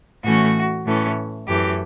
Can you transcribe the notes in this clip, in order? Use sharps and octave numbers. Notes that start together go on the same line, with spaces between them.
A2 E3 A3 C#4 F#4
A2 E3 A3 C#4
F#2 E3 A3 G4